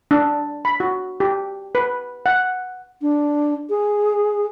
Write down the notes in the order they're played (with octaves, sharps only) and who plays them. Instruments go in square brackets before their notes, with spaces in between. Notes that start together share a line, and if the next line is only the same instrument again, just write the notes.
[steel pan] D4
B5
F#4
G4
B4
F#5
[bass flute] D4
G#4